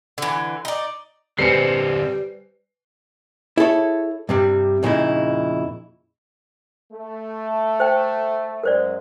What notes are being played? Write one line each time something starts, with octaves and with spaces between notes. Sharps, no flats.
D3 E3
D#4 D5
D3 G3 C4 B4 C5 G#5 C7 C#7
E4 G#4 A4 C#5
G2 C3 G3
F2 A#2 C#3 D#4 E4
A3
C5 G5
F#2 G#3 A#4 C5 D5